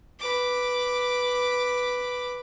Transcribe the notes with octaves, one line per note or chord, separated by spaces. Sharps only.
B4 D6